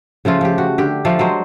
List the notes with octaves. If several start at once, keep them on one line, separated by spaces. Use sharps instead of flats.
C#3 F3 A3 F4
F3 G4
F#4
D3 G4
F3 A3 D5 F5
F#3 G#3 C5